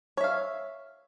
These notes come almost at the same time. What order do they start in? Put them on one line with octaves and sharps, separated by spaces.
C#5 E5 F5